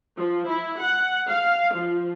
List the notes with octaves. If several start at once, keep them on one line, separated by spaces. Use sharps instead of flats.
F3
E4
F#5
F5
F3